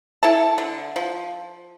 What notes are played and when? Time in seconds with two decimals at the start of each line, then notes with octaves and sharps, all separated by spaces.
0.23 E4 A4 A5
0.58 D3
0.96 F3